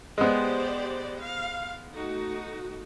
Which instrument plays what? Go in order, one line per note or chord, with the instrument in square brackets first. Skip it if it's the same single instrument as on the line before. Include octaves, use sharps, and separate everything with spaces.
[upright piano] G#3 B3 [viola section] G4 C5 D5
[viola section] F5
A3 D#4 F#4